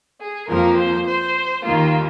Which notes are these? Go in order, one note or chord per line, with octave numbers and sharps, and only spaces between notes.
G#4
F2 F3 A#3 A#4
C5
C5
D#2 D#3 A#3 F4